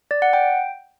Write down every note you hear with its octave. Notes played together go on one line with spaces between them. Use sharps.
D5
F#5
G5